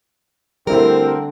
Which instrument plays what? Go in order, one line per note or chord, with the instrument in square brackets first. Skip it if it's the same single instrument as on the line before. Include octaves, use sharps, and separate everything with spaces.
[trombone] D3 [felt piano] G3 A3 E4 [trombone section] C4 [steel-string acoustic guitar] A#4